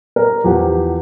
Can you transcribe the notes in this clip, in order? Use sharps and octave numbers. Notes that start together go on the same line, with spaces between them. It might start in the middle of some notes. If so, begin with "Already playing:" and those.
A#4
E2 F3 G4 F#5